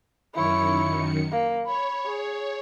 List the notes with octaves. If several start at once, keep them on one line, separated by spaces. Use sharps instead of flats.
F#2 D#3 E4 C#5 C#7
A#3
C#5 B5
G#4